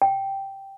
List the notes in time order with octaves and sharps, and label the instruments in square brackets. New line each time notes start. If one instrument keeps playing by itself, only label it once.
[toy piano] G5